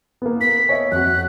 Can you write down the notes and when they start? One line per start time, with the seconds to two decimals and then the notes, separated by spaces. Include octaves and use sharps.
0.22 A#3 B3
0.41 B3 B6
0.69 C#5 D#5 E5
0.92 F2 F#4 F#6